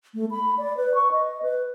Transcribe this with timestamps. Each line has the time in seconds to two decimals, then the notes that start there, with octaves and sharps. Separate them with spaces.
0.14 A3
0.31 B5
0.58 D5
0.77 B4
0.94 C#6
1.11 D#5
1.42 B4